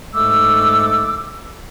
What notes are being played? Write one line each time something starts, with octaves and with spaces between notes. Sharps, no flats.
G#2 G#3 A3 A4 D6 E6